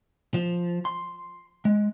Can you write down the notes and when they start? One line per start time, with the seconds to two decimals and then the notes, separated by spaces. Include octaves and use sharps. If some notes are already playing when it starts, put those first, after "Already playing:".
0.34 F3
0.85 C6
1.65 G#3